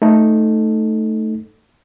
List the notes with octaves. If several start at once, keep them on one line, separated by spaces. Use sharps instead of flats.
A3 D#4 A4